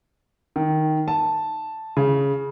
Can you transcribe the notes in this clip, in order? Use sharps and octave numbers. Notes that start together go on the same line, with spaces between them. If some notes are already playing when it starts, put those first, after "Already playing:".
D#3
A5
C#3